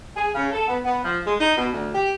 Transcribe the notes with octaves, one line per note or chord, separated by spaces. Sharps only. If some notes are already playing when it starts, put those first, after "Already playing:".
G#4
C#3
A4
B3
B3
F3
G#3
D#4
B2
D2
G4